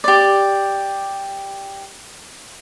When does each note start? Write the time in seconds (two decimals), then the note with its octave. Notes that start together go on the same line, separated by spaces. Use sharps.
0.04 G4 D5